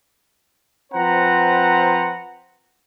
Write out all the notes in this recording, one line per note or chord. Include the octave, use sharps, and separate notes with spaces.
F3 C4 B4 C5 F#5 A#5